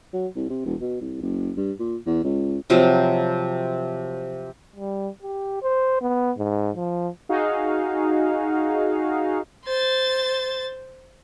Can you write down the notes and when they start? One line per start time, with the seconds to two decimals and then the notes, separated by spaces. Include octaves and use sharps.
0.13 F#3
0.36 C2
0.50 C3
0.66 E1
0.81 B2
1.01 C2
1.21 F#1
1.57 G2
1.80 A#2
2.06 E2
2.24 C#2
2.70 C3 F3 F#3
4.76 G3
5.22 G4
5.63 C5
6.01 B3
6.37 G#2
6.76 F3
7.29 D#4 F#4 G#4 F5
9.65 C5 A6